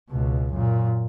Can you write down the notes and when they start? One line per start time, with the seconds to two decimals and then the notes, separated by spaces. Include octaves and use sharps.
0.10 C#2 B2
0.52 F#2 A#2